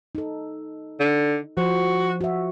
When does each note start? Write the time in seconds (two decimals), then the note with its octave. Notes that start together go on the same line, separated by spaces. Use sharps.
0.15 D#4 A4
1.00 D3
1.57 F3 F#4 C5
2.21 F#4 E5